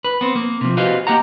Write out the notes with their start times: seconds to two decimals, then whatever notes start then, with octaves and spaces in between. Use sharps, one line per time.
0.04 B4
0.21 B3 C4
0.36 A#3
0.61 C3 F3
0.77 F#4 G4 B4 C5 D#5 F5
1.07 A#3 G4 D#5 F#5 A#5